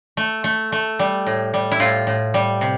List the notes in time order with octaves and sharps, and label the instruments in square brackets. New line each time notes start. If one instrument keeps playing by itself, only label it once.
[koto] A3
A3
A3
G3
A2
G3
E4
A2 F4
A2
G3
C3